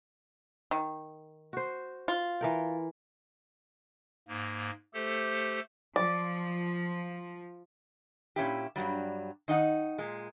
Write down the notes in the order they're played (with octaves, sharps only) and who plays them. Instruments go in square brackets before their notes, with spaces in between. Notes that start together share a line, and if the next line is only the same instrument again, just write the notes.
[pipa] D#3
[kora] F#4 C5
[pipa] F4
[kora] E3 A#4 G5
[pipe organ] G#2 A#3
A3 G4 A4 C5
[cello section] F3 [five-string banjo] D5
[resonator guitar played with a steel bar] A#2 C#4 E4 G4
G2 C3 F#3 G3
D#3 D#4 D#5 F#5
A#2 G#3